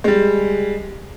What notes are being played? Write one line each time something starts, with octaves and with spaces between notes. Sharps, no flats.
G3 G#3